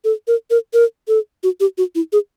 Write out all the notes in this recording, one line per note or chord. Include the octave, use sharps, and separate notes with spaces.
A4
A#4
A#4
A#4
A4
F#4
G4
F#4
E4
G#4